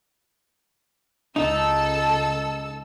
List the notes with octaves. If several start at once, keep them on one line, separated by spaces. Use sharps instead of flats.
C#2 D#4 A4 E6